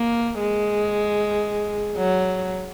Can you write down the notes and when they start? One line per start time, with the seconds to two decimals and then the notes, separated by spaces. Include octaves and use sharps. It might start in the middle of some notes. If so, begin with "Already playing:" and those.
Already playing: A#3
0.40 G#3
1.98 F#3